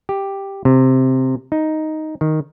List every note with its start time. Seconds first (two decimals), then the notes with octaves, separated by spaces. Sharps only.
0.09 G4
0.65 C3
1.52 D#4
2.21 D#3